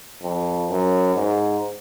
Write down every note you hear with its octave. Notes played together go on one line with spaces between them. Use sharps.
F2
F#2
G#2